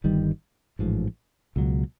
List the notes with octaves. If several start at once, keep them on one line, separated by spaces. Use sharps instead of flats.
G1 G2 D#3 G3
A1 G#2 F3
C#2 B2 F#3